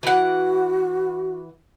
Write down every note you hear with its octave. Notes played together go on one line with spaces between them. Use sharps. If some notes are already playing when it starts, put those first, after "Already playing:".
E3 F#4 F#5